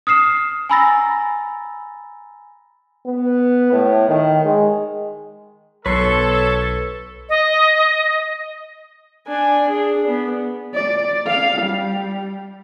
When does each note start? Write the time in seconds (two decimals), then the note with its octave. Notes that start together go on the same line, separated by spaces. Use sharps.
0.07 D#6 F6 C7 E7
0.69 G#5 A#5 B5 E6 A6 A#6
3.07 B3
3.72 A2
4.08 D#3
4.45 G#3
5.86 B1 A4 B4 C#5 C6
7.29 D#5
9.27 D4 G#5
9.67 D4 G#4
10.07 B3
10.75 D5
11.27 F5
11.62 G3